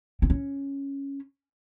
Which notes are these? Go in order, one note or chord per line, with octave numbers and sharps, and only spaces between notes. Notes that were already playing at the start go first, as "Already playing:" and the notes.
C4
C#4